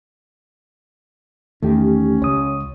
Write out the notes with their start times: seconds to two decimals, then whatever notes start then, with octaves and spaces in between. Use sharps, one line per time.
1.62 E2 D#3 A3 C#4 G4
2.22 C#2 C#5 D#6